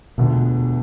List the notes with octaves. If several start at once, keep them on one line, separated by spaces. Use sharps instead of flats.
E1 D2 B2 D3 F3